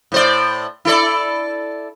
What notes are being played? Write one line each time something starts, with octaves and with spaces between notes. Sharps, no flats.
A2 C5 D5
E4 A4 D5